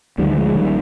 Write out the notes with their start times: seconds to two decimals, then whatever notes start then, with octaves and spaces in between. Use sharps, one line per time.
0.18 D2 D#3 G3
0.22 D3
0.31 G3
0.37 F3 G#3
0.55 A#1 D#3 G3